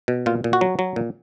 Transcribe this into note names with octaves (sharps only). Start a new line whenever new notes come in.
B2
A#2 F4
A#2
F#4
F#3
F#3
A#2